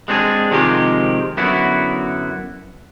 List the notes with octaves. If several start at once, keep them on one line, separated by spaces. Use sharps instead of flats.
G#3 C4 D4 F#4 G#4
C3 D#3 F3 G#3 G4
F#2 D3 B3 E4 F#4